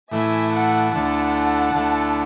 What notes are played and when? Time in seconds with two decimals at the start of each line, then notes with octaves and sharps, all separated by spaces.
0.11 A2 E3 A3 E4 E5 G#5
0.51 F#5 A5
0.92 D2 D3 A3 E4 F#5 A5
1.73 D2 D3 A3 E4